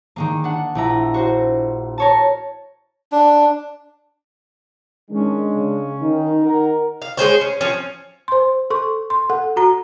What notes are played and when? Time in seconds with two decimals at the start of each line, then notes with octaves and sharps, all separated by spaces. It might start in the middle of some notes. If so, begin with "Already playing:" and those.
0.16 D#3 G#3 A#3
0.44 D4 F#5
0.75 A#1 E4 A#5
1.14 F#4 C5
1.98 A#4 C#5 A5
3.12 D4
5.10 D#3 G#3 C#4 D4
5.55 C#3
6.02 D#3 D#4
6.44 D#3 A#4 F#5 A#5
7.02 F5
7.17 G#3 G#4 C5 C#5
7.41 C#4
7.61 F3 C#4
8.28 C5 C6
8.70 A4 C6 C#6
9.10 C6
9.30 A4 F#5
9.56 F#4 A#5